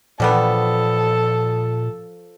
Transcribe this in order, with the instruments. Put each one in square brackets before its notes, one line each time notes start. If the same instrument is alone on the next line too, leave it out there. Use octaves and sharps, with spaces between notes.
[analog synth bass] A#2 [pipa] D3 G3 B3 [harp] F3 [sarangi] A4